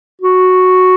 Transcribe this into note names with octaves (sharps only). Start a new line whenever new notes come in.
F#4